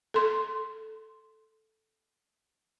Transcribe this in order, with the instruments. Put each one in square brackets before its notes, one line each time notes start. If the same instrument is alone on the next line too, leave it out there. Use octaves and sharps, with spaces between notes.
[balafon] A4 C6